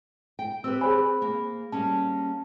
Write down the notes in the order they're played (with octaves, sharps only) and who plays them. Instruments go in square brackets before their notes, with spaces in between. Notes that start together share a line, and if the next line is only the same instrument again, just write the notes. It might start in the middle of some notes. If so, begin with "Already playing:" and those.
[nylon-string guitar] G5
[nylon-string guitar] C4 G4 B4 [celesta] E6
[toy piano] G#4 C5 G#5 [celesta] B5
[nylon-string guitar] A#3
[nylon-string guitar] G3 A#3 C#4 [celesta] A5